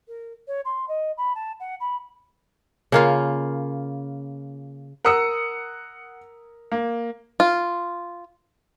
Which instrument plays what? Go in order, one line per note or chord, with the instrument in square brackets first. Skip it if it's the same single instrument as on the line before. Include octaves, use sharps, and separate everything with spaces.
[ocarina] A#4
C#5
C6
D#5
B5
A5
F#5
B5
[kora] C#3 A#3 F4
[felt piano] A#4 D#6 E6 [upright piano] F#5 C#7
[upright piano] A#3
[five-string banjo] F4